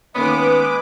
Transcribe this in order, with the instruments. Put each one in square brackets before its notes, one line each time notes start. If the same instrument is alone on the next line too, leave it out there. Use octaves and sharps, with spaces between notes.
[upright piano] D#3 A#3 C#4 [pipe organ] G#3 D#6 [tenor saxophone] B3 [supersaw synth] B4 D6